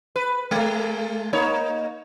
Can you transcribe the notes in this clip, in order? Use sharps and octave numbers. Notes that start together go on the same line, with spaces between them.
B4
G#3 A3
A#3 D#4 C#5